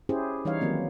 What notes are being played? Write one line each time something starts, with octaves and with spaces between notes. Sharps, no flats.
C#4 E4 G4 G#4 C5
E3 G3 D#4 C#5 F5
D#3 F#3 A#3 C4